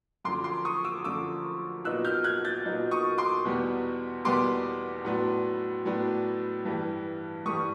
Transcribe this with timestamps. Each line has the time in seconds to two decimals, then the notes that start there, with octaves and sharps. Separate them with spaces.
0.25 F#2 D3 F3 C6 D6
0.44 C6 D6
0.65 C#6 D#6
0.84 D6 E6
1.04 F#2 D3 F3 D6 E6
1.84 A#2 F#3 B3 D#4 E6 F#6
2.05 F6 G6
2.24 F#6 G#6
2.45 G6 A6
2.65 A#2 F#3 B3 D#4
2.91 C#6 D#6
3.18 C6 D6
3.45 E2 B2 G3 B3
4.25 E2 B2 G3 B3 C6 D6
5.05 A2 F#3 B3 D4
5.85 A2 F#3 B3 D4
6.65 G2 E3 G3
7.45 G2 E3 G3 C#6 D#6